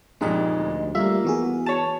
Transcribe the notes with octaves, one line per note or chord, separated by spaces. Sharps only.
F2 A#2 G#3 D#4 G4 D#5
D2
G3 A3 A#3 F4 E5
E3 B3 F#4 G#4
C#5 A5